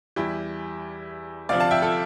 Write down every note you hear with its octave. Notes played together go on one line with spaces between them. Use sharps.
E2 E3 G3 E4 G4
D2 C3 F3 D5 F5
F5 A5
E5 G5
F4 A4